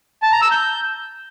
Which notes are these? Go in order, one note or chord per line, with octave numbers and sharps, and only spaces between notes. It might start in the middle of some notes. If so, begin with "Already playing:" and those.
A5
A#5
E6
G6